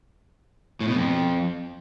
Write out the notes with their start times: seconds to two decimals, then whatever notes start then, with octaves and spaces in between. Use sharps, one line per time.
0.80 A2
0.88 B2
0.95 F2